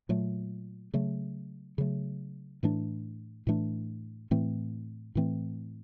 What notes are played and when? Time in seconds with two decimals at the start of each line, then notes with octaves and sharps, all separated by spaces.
0.09 A#2 F#3 A3
0.94 C#3 F#3 A3
1.78 C#3 F#3 A3
2.63 A2 E3 A3 D4
3.47 A2 E3 A3 D4
4.31 A2 E3 A3 C4
5.15 A2 E3 A3 C4